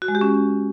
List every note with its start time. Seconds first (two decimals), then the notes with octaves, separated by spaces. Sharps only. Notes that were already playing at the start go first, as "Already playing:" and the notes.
0.02 F#4
0.08 G#3
0.15 G4
0.21 C#4